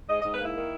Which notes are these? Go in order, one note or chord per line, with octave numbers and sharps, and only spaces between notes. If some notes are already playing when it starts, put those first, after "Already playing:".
G#2 D#5
D#5
G#2
B4
A#3 E4
D#3